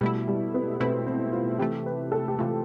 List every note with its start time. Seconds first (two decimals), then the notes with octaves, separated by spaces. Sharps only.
0.01 B2 G3 A3 E4
0.28 G3
0.54 B3
0.80 B2 A3 C4 E4
1.07 C4
1.33 F4
1.59 C3 E3 A3 G4
1.86 B4
2.12 A4
2.28 G4
2.39 C3 E3 A3 F4